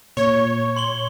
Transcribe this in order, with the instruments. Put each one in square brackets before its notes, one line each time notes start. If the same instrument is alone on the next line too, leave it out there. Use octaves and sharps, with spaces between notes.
[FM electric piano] A#2 [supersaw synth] C#5 [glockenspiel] C#6
[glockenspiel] C6 F#7 G7